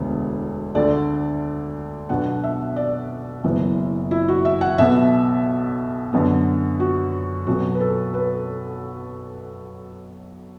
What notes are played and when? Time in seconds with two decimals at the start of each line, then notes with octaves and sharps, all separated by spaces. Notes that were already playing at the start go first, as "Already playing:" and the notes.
Already playing: E1 D2 D3 B3
0.75 D2 D3 A3 D5
2.09 B1 B2 B3 D4 F#5
2.44 E5
2.76 D5
3.44 F#1 F#2 E3 B3
4.11 E4
4.28 F#4
4.45 E5
4.61 F#5
4.78 B1 B2 B3 E5
6.13 F#2 D3 B3
6.80 F#4
7.47 B1 B2 F#3 B3 F#4
7.74 B4
7.80 A4
8.14 B4